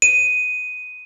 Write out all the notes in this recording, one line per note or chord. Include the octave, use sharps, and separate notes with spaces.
D#7